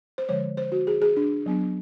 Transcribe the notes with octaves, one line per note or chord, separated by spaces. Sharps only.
C5
D3 F3 G#3 C#5
C5
F#4
G#4
G#4
D4
F#3 B3 D4